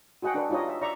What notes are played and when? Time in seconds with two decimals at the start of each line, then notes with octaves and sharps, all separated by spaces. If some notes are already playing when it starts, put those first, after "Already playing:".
0.22 F#4 G#4 D#5 F#5 G5
0.34 D4 A4 B4
0.50 D#4 F4 G4 C#5 D#5
0.68 E5
0.82 D5 E5 A#5 C#6